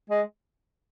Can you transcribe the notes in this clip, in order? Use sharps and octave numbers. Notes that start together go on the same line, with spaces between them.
G#3